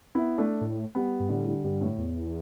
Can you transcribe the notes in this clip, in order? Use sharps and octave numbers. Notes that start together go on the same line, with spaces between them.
B3 E4
A3 D4
A2
G3 B3
G2
A2 D3 G3
D3 G3
G2 D3 G3
A2
E2